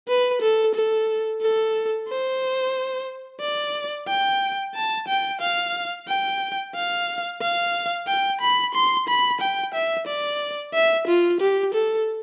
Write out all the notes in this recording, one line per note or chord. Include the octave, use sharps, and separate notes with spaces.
B4
A4
A4
A4
C5
D5
G5
A5
G5
F5
G5
F5
F5
G5
B5
C6
B5
G5
E5
D5
E5
F4
G4
A4